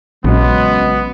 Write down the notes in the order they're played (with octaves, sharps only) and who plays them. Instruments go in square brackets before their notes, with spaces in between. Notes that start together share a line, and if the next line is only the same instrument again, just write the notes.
[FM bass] A#1 [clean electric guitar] C#3 F#3 C#4 [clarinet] G#3 [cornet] B3